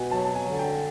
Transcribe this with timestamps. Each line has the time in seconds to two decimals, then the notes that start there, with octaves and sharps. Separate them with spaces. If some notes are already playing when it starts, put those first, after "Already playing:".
Already playing: B2 F#5 G#5
0.11 F#3 A5
0.25 A5
0.35 G#5
0.47 D3
0.59 G5